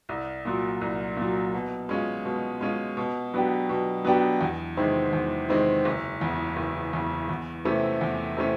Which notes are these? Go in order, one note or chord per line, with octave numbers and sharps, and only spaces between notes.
C2
A#2 F#3
C2
A#2 F#3
B2
G#3 C#4 F4
B2
G#3 C#4 F4
B2
F#3 B3 D4 G4
B2
F#3 B3 D4 G4
E2
C3 D#3 G#3 C4
E2
C3 D#3 G#3 C4
F#1
E2 C#3
F#1
E2 C#3
E2
C3 E3 A3 C#4
E2
C3 E3 A3 C#4